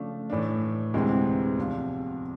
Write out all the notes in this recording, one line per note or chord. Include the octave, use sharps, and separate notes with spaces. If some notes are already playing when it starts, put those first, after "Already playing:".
Already playing: C#3 F3 A3 D4
A2 E3 A3 D4
D2 C3 E3 G#3 C4
E2 C3 F3